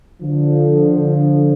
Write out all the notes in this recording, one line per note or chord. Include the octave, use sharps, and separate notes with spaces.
D3 F3